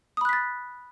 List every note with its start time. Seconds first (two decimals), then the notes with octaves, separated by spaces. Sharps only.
0.17 D#6
0.21 B5
0.25 F#6
0.29 B6
0.33 A6